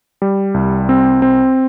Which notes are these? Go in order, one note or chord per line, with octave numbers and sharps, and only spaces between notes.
G3
C2
C4
C4